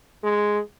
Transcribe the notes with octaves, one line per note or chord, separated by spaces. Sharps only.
G#3